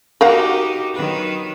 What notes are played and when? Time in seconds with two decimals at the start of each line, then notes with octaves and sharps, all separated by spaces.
0.21 D#4 F#4 G4 A#4 F5 F#5
0.94 D#3 F#3 B4